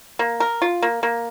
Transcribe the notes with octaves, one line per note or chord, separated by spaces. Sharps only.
A#3
A#4
F4
A#3
A#3